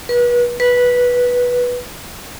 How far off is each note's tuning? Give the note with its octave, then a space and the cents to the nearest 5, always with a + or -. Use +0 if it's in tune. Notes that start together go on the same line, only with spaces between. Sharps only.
B4 -35
B4 -10